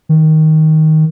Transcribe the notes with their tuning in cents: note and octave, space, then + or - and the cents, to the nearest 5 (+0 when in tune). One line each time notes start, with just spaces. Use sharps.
D#3 +10